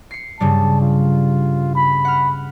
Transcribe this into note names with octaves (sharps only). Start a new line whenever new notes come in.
C7 C#7
G2 C#3 G3 A5
F4
B5
F#5 F6